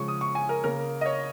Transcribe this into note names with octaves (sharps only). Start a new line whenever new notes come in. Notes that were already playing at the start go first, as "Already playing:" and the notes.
Already playing: C#3 F3 G#3 C#6
D#6
C#6
G#5
A#4
C#3 A#3 A#4
D#5
C#5